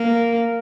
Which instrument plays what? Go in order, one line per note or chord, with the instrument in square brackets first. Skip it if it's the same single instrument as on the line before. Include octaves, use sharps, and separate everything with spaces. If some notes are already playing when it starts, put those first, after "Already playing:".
Already playing: [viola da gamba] A#3